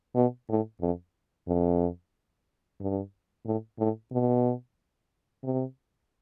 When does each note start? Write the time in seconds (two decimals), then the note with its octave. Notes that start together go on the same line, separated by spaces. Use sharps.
0.15 B2
0.49 A2
0.81 F2
1.47 F2
2.80 G2
3.45 A2
3.79 A2
4.12 B2
5.43 C3